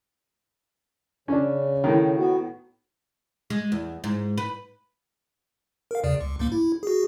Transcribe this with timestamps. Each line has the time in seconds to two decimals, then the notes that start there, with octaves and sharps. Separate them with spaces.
1.28 C#3 C#4 D4
1.84 A2 D#3
2.18 B3 F#4
3.50 G#3
3.72 E2
4.04 G#2
4.38 B4
5.91 A#4 F5
6.04 E2 C#3 D5
6.20 C#2
6.39 C#2 G#2 A#3
6.52 E4
6.83 F#4 G#4